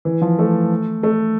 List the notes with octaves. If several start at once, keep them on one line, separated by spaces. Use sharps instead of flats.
E3
F3
A3
A3